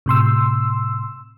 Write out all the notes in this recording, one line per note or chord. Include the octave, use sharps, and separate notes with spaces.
A2 C3 C6 E6